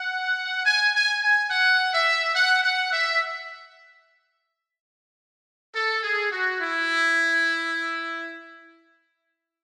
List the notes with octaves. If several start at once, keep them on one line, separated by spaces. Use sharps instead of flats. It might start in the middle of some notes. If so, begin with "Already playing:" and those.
Already playing: F#5
G#5
G#5
G#5
F#5
E5
F#5
F#5
E5
A4
G#4
F#4
E4